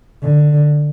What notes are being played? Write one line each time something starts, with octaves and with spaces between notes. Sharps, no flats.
D3